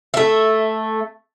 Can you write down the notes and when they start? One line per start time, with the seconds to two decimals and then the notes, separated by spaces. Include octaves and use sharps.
0.14 A3 E5